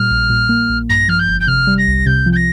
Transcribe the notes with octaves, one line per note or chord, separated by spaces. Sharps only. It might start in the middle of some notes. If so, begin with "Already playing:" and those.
Already playing: A#2 G3 F6
A#1
A#2
A#3
A#1
G2 A#6
F3 F6
G6
G1
G6
C3 F6
G3
A#6
C2
C3 G6
F3
G6
A#6